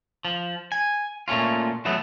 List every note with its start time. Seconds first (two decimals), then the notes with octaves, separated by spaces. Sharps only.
0.25 F3
0.72 G#5
1.28 A#2 A3 C#4 F4
1.85 E3 F#3 A3 B3